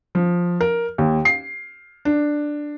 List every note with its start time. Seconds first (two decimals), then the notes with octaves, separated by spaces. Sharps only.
0.15 F3
0.61 A#4
0.98 D#2
1.25 C7
2.05 D4